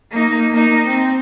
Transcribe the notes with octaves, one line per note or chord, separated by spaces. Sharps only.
A#3 D#4
A#3 D#4
C4